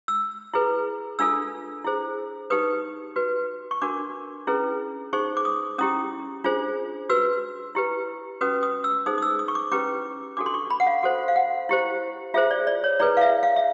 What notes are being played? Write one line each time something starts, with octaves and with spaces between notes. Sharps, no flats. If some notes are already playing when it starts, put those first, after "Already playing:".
E6
E4 G#4 B4
D4 F4 A4 E6
E4 G#4 C5
D#4 G4 B4 D#6
F#4 B4
C#6
D4 F#4 A#4 D6
C#4 E4 G#4 B4
D#4 G#4 C5 C#6
D6
D#6
C#4 E4 G4 D#6
D4 F4 G#4 C5
F#4 B4 E6
E4 G4 B4
C#4 F#4 B4 D#6
D#6
E6
D#4 G#4 C5 D#6
D#6
E6
D#6
C#6
D6
C#4 E4 G4 B4 D6
D4 F#4 A4 D6
C6
C#6
B5
F#5
F5
F#4 A4 C5 F#5
F5
F#5
E4 G4 C5
F4 G#4 C5 E5
D5
D5
C#5
E4 G#4 B4 D5
F5
E5
F5
E5